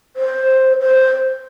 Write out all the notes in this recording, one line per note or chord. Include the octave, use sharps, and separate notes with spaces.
C5
C5